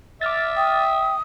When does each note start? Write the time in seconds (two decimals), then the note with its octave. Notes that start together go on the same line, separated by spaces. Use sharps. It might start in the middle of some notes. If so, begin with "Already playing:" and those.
0.21 E5 D6 F6 A6
0.57 G5 D#6